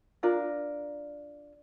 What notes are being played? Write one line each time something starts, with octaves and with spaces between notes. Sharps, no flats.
D4 F4 A#4